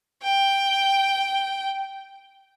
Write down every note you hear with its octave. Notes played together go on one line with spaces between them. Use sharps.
G5